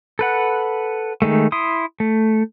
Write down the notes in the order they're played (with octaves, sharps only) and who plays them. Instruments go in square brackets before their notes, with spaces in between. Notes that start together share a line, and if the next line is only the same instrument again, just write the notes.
[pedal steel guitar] A4 B4 F#5
D#3 G#3 A3
E4 C6 D#6
A3